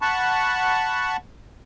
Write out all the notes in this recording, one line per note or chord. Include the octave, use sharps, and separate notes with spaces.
F#5 A5 B5 C#6